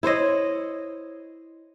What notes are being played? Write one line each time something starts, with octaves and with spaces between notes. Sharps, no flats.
E4 C5 C#5 D#5